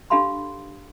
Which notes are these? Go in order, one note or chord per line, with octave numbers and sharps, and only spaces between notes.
D4 G4 A4 F5 B5 C6